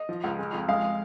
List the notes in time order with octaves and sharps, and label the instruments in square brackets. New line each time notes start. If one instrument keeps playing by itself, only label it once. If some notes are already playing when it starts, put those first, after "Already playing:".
Already playing: [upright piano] D#5
F3
C#2
G#3
F2
G#3 F5